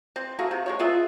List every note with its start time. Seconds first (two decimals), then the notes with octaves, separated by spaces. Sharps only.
0.16 C4
0.39 A3 A#3 F#4 G#4
0.51 C3
0.66 G#3 C4 C#5
0.79 B3 F4 G#4 E5